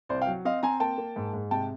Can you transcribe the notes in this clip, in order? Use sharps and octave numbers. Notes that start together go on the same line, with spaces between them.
C2 C5 D5
F5 G5
F#3
C4 D#5 F5
C4 G#5 A#5
A#3 G5 A5
A#3
G#2
G#2
C3 G5 A5